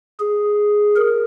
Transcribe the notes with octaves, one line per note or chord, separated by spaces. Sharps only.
G#4
A#4